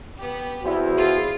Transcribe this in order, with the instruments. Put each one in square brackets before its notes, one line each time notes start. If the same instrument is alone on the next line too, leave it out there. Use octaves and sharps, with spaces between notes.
[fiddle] B3 G4
[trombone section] E2 E4 [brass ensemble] F#4 C5
[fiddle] F4 [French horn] G#4